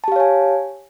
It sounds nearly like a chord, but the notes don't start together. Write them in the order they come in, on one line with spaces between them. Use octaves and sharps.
A5 G4 F5 C#5 G#5